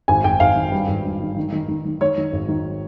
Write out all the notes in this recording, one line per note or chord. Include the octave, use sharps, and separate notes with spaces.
G#1 G#5
G#1 G5
G#1 F5
D#3
G2
G#1
G2
D#3
D#3
D#3
D#3
D#3
D#3 C#5
D#3
G#1
D#3